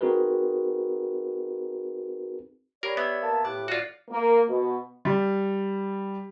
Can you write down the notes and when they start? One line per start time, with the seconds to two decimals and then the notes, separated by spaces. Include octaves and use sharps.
0.01 C4 D#4 F#4 G#4 A#4 B4
2.83 G4 A#4 C#5 D5 B5
2.97 B3 E5 E6 G#6
3.22 A#3 A5
3.45 A2 G4 D6 F#6
3.68 F4 F#4 D5
4.11 A#3
4.49 B2
5.05 G3